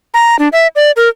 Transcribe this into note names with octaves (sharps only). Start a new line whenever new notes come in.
A#5
D4
E5
D5
A#4